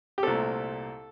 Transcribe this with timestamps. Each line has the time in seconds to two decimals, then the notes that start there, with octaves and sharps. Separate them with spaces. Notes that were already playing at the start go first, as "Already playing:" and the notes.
0.18 G4
0.23 C2 A#2 A3 C4 A4